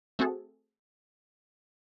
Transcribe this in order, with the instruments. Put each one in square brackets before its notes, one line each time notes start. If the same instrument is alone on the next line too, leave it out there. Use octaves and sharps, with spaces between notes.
[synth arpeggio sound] A3 C4 F#4 G#4 A4